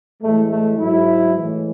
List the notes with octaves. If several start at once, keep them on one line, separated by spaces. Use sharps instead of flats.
A2 E3 G#3 A3
A3
G#2 F#3 E4
A2 E3 G#3